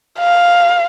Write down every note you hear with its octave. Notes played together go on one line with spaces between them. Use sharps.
F5